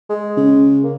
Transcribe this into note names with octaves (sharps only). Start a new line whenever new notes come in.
G#3
C#3
A#3